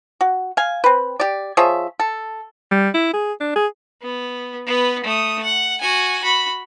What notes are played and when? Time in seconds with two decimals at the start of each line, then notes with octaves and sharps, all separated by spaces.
0.21 F#4
0.57 F5 G#5
0.84 C4 B4
1.20 G4 D5
1.57 F3 G#4 C#5 E5
2.00 A4
2.71 G3
2.94 E4
3.13 G#4
3.40 D4
3.56 G#4
4.02 B3
4.66 B3 B4
5.04 A3 D#6
5.43 F#5
5.81 F#4 G#5
6.22 F#4 B5